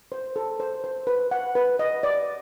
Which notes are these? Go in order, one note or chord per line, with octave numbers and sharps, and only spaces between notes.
C5
A4
C5
C5
B4
F#5
B4
D#5
D5